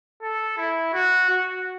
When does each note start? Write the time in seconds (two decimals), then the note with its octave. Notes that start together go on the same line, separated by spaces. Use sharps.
0.22 A4
0.58 E4
0.93 F#4
1.29 F#4